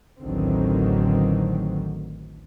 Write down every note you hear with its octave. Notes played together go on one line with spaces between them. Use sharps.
A1 D2 D3 D#3 F#3 C4